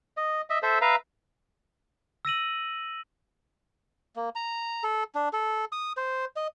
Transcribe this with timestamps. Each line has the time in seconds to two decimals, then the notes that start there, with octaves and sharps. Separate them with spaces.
0.17 D#5
0.50 D#5 E5
0.63 A4 C5 E5
0.81 B4 E5 F5 A#5
2.25 E6 A#6 D#7 F#7
4.16 A#3
4.35 A#5
4.84 A4
5.15 D4
5.33 A4
5.72 D#6
5.97 C5
6.36 D#5